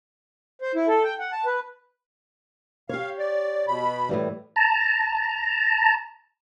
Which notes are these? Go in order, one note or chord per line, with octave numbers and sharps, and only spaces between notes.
C5
E4
A4
G5
F#5
A5
B4
G4 C#5 F5
D5
B2 B5
A2 E3 G3
A5 A#5